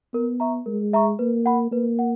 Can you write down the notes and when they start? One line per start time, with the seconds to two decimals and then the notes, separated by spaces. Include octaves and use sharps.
0.13 B3 A#4
0.40 E5 A#5 C#6
0.66 G#3 A#4
0.93 E5 A#5 C#6
1.19 A#3 B4
1.46 F#5 B5
1.72 A#3 B4
1.99 F#5